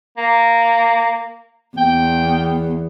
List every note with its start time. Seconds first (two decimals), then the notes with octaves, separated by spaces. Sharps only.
0.17 A#3
1.77 E2 G5